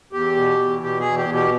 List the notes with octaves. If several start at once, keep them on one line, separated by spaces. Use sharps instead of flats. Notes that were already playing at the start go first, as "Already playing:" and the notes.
E2 G4
B2
E2
B2 G4
G#4
E2
G4
B2
G4